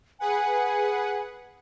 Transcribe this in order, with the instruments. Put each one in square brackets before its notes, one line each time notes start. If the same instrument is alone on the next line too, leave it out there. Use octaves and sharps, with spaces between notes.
[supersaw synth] G#4 B4 F#5 [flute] G#5